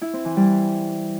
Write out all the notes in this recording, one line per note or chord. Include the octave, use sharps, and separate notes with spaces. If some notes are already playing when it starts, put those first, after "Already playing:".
E4
C4
E3
G3